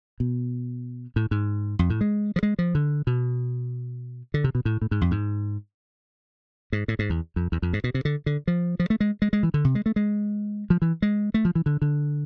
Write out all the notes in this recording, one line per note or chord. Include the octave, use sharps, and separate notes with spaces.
B2
A2
G#2
F2
A2
G#3
F3
G#3
F3
D3
B2
D3
C3
B2
A2
A2
G#2
F2
G#2
G#2
A2
G#2
E2
F2
E2
F2
G#2
B2
C3
D3
D3
F3
F3
A3
G#3
G#3
G#3
E3
D3
C3
G#3
A3
G#3
F3
E3
G#3
A3
F3
E3
D3
D3